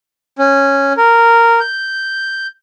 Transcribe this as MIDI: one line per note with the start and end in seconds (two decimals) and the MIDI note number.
0.39 0.93 61
0.97 1.60 70
1.60 2.47 91